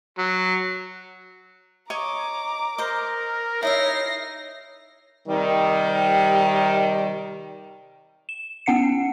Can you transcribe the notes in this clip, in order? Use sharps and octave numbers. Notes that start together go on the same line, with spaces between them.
F#3
C#5 D#5 A#5 C#6 D6
A#4 C5 D#5
D#4 E4 C#5 D#5 E5 A#6 C7
C3 D#3 G3
E7
B3 C#4 F#5 C7 C#7